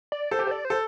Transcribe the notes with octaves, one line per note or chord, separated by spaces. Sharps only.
D5
A4 C5
G4
A4
D5
C5
A4